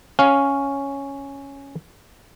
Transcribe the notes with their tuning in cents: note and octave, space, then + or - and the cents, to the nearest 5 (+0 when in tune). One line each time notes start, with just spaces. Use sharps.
C#4 +0 F5 +0